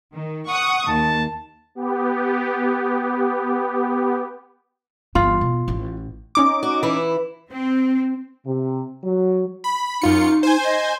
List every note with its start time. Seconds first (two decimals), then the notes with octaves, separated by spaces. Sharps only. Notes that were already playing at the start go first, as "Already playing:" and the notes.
0.14 D#3
0.47 F#5 C#6 D#6
0.88 D#2 A5
1.75 B3 G4
5.15 G1 E3 F4
5.41 B2
5.68 A1
6.35 C#4 D#4 D6
6.63 F#4
6.83 E3 E4
7.51 C4
8.46 C3
9.04 F#3
9.64 B5
10.02 F#2 D#4 F4 C#7
10.43 C5 G#5
10.64 D#5